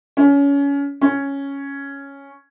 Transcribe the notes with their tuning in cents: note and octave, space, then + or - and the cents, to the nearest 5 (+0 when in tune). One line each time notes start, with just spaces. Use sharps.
C#4 +25
C#4 +0